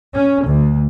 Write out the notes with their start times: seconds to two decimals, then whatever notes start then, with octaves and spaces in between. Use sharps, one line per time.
0.11 C#4
0.46 D2